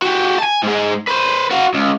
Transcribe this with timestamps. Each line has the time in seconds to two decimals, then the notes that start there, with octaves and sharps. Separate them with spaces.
0.02 F#4 G4
0.39 G#5 A5
0.63 G#2 G#3
1.08 B4 C5
1.51 F#4 F5
1.74 C#2